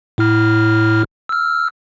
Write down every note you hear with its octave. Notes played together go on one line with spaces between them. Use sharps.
A2 E4 F6
E6 F6